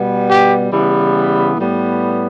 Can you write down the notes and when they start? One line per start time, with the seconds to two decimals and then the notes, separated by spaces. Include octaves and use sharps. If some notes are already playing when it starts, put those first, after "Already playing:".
Already playing: B2 G3 B3
0.30 G4
0.72 C#3 E3 G3 B3
1.58 A2 G3 B3